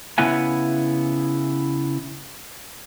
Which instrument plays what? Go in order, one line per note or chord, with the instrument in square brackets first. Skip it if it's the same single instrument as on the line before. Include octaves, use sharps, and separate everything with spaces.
[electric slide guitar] C#3 B3 E4 F#5 G#5